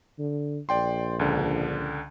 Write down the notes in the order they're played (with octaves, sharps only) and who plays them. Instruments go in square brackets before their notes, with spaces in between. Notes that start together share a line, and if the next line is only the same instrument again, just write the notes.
[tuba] D3
[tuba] A#1 [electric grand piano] D5 G5 C6
[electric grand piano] C#2 D3